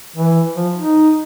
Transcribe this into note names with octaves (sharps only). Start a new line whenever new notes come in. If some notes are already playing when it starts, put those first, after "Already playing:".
E3
F3
D#4